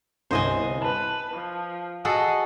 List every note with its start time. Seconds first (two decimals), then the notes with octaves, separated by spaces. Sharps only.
0.31 G1 C2 C5 D#5 G#5
0.82 B4 A5
1.33 F3
2.05 F#4 G#4 A4 D#5